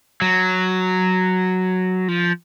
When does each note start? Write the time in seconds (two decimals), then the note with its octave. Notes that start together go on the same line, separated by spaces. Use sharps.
0.21 F#3
2.08 F3